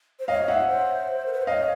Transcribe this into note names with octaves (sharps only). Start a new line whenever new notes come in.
C5
C#5 D#5 F5
E5 F#5
C5
A#4
B4
C5
C#5 D#5 F5